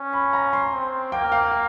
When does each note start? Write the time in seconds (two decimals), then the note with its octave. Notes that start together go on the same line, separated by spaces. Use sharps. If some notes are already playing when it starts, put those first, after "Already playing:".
Already playing: C#4
0.13 B5
0.33 A#5
0.53 C6
0.73 C4
1.12 A#3 G5
1.32 F5
1.52 F5